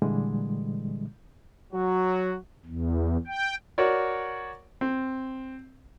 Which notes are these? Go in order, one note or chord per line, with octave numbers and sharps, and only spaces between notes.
A#2 D3 E3 G3 G#3
F#3 F#4
E2
G5
F#4 A#4 C#5 D5
C4